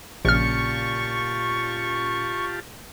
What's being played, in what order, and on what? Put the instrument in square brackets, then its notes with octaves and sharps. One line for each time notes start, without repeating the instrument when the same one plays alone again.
[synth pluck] A#1 F6 [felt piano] A#2 C#3 [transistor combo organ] F4 G4 A5 [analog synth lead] C#6